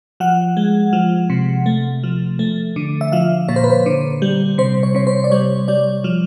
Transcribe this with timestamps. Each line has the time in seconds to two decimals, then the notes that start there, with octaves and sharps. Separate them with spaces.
0.20 F3 F#5
0.57 G#3
0.93 F3
1.30 C3
1.66 A3
2.03 F3
2.39 A3
2.76 D3
3.01 E5
3.12 F3 F5
3.48 A#2 C#5
3.56 C5
3.64 B4
3.70 C5
3.86 D3
4.22 G3
4.58 C3 C5
4.83 C#5
4.95 C3 C#5
5.07 C5
5.24 D5
5.31 G3 C#5
5.68 G3 D5
6.04 F3